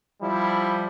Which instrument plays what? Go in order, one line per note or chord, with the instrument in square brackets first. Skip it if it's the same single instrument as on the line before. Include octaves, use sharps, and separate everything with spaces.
[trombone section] F3 G3 E4